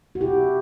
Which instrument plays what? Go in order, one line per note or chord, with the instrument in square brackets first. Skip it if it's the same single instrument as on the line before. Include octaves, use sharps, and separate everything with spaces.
[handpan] F#4
C3 E4 G4